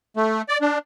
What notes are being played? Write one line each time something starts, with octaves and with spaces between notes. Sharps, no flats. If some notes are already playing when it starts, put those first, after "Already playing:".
A3
D5
D4